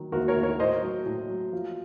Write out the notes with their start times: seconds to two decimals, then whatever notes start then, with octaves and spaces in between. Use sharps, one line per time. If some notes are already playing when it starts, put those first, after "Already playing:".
Already playing: D#3 F#3
0.12 D#2 F#4 A#4
0.28 A#4 C#5
0.36 D#2
0.43 A#4 C#5
0.60 A2 C5 D#5
0.82 F#3
1.06 A2
1.29 F#3
1.53 F3